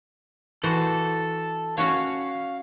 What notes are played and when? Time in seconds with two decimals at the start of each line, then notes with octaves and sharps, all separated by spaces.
0.64 E3 F#4 A4 C5
1.78 C#4 F#4 C#5 F5